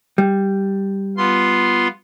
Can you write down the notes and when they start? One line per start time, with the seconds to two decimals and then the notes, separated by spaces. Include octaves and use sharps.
0.18 G3
1.17 B3 F4 C6